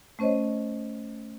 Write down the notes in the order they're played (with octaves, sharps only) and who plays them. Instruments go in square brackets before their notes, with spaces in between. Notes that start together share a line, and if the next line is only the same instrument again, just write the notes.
[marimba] A3 C#4 C5 C#5 D#5